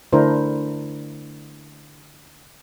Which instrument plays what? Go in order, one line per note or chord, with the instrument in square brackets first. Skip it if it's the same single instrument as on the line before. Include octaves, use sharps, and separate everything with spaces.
[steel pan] D3 A3 D4 E4 A#4 C5